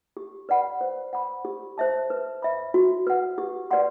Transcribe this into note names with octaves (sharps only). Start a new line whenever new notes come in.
G4
B4 D5 F#5 B5
C5
F#5 B5
G4
C5 E5 A5
B4
E5 B5
F#4
B4 F#5
G4
B4 D5 F#5 C6